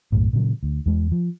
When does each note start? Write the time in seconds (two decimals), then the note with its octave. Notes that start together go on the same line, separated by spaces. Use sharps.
0.12 B1 F#2 A2
0.33 A#2 C#3 F#3
0.63 D2
0.86 E2 G#3
1.12 F3